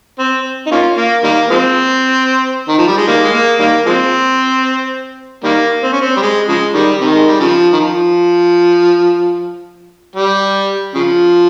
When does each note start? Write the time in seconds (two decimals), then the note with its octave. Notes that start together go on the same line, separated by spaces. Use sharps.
0.19 C4
0.67 D#4
0.71 A#3 C#4 F4
0.97 A#3
1.23 D#3 G3 A#3
1.50 F3 G#3 C4
2.68 D#3
2.78 F3
2.87 G3
2.97 G#3
3.07 D#3 G3 A#3
3.23 G#3
3.33 A#3
3.59 D#3 G3 A#3
3.86 F3 G#3 C4
5.44 D#3 G3 A#3
5.83 C4
5.92 C#4
6.01 C4
6.17 G3
6.22 G#3
6.48 C#3 F3 G#3
6.74 D#3 G3
7.01 C3 D#3
7.14 G#3
7.27 G3
7.40 C#3 F3
7.73 D#3
7.80 F3
10.16 G3
10.94 C#3 F3